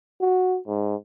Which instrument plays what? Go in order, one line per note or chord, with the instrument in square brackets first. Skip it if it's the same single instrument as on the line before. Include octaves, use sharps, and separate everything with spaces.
[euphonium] F#4
G#2